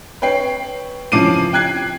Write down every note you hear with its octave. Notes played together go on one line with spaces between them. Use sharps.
B4 C#5 G5 C7
C#3 E3 F3 D6 C7 D#7
G5 F#6 G#6 C7